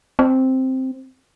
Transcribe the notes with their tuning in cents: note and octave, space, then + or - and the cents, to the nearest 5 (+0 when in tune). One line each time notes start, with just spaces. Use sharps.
C4 +0